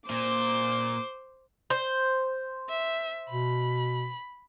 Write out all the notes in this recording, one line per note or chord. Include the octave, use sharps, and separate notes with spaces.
A#2 C5 D6
C5
E5
B2 B5